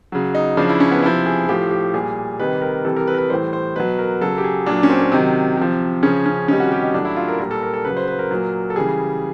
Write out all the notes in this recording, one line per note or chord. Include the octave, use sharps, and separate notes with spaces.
C#3 F#3
D#4
C#3 F3 D4
E4
C#4
B3
C3 F3 E4
G#4
A2 F3 G4
G4
A#2 G3 G#4
C3 D#3 G3 B4
A#4
C3 E3 G3 A4
A#4
B4
A#4
B4
A2 E3 G3 C5
C5
B2 F#3 B4
A#4
C#3 F#3 A4
G4
G#4
A#2 F#3 D4
C#4
C4
C4
C3 D#3 F#3
C3 F3
C#3 F3 C#4
C#4
C3 D#3 G3 C#4
F#4
G4
D#4
A2 F#3 D4
E4
F4
A#4
A#2 G3 A#4
A4
A#4
A4
C#3 F#3 B4
C5
B4
A#4
A#2 F#3
A4
C#3 E3 G3 G#4